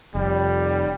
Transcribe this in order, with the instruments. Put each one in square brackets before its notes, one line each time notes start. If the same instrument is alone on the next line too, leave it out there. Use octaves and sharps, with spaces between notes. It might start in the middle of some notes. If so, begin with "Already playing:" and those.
[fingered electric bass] F1 [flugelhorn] G3